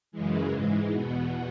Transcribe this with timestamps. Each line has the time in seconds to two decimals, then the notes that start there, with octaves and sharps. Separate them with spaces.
0.12 F#2 C#3 E3 G#3
0.52 G#2 E3
0.91 E2 B2 B3